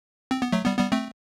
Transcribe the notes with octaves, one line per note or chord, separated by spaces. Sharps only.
C4
B3
F#3 A3
G3 B3
G3 B3
A3 C4